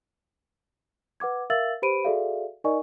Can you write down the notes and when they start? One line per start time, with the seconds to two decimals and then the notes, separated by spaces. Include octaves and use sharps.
1.20 B4 F#5 D6 G#6
1.50 A#4 E5 F5 E6 A6 F#7
1.82 G4 B4 C5 B5 D7 D#7
2.05 F#4 G#4 A4 D5 E5 F5
2.64 D#4 A#4 D5 D#5 G#5 C#6